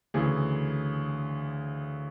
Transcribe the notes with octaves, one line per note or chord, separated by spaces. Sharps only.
D2 C#3 E3 G#4